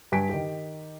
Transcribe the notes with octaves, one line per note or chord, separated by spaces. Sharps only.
G2 G#5 B6 D7
D#3 G4